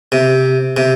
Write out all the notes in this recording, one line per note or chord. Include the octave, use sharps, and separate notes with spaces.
C3
C3